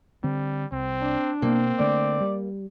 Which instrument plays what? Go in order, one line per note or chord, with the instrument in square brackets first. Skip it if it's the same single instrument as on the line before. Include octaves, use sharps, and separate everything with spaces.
[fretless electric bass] D3 C4 [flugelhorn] G3
[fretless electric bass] C2 [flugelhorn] C4
[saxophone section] D4
[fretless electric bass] B2 [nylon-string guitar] A#3 [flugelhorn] C4
[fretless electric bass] D3 A3 [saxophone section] D5
[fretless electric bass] G3